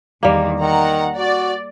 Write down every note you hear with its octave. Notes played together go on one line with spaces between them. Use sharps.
E2 D#3 G3 A#3
D#3 F#5 A#5
F#4 D5